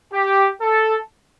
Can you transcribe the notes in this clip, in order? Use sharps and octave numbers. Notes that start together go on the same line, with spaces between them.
G4
A4